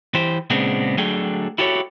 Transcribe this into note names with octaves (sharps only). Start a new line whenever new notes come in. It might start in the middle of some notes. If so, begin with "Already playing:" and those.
E3 G4 C5
A#2 C#3 G#3 B3 C4 D4
D3 F#3 A3 D4 G#4 G5
E4 F#4 G4 A4 B4 C#5